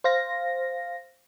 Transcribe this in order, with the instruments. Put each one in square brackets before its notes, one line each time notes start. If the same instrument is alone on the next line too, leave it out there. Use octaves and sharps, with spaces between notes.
[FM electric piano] C5 F5 A#6